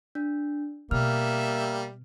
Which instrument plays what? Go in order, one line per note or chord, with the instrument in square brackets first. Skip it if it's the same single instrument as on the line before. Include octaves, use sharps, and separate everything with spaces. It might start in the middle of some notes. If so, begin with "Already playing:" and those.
[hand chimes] D4
[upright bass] B2 [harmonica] G3 E5 [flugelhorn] A#3 [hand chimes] F6